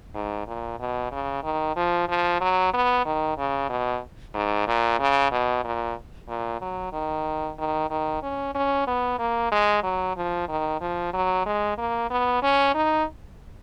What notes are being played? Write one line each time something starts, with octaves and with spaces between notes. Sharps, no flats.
G#2
A#2
B2
C#3
D#3
F3
F3
F#3
B3
D#3
C#3
B2
G#2
A#2
C#3
B2
A#2
A#2
F#3
D#3
D#3
D#3
C#4
C#4
B3
A#3
G#3
F#3
F3
D#3
F3
F#3
G#3
A#3
B3
C#4
D#4